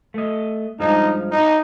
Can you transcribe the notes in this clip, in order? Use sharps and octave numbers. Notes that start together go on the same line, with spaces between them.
A3 D#5
G2 F3 G#3 D#4
D#4